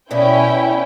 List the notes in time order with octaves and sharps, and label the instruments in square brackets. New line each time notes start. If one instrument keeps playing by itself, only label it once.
[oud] B2 D5 E5 [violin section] C#4 E4 G5